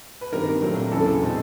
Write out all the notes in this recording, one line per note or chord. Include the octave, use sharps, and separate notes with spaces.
B4
G2 D#3 G3 C4 A#4
A#2 F#3 A3 C4
E2 C#3 F#3 B3 D4 A4
B2 G#3 C4